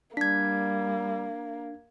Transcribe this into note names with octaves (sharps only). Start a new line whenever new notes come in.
G3 A#3 D4 G#6 B6